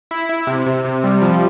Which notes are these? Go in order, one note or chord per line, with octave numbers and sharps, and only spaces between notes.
E4
E4
C3
C3
C3
G3
F3